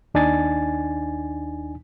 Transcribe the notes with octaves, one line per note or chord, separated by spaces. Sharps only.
D#2 D4 D#4 G#5 A6